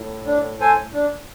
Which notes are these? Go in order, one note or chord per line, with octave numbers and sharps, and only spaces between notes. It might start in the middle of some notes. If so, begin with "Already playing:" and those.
Already playing: A2
D4
A4 C5 G#5
D4